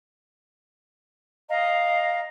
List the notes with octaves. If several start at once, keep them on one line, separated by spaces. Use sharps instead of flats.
D#5 F5 A#5